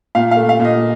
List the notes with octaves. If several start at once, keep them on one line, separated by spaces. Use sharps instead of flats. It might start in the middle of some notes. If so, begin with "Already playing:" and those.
A#2 F5
F5
A3
F5
A#2
D#5